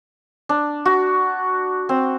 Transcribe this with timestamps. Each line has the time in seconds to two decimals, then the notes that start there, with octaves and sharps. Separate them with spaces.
0.49 D4
0.86 F#4
1.89 C4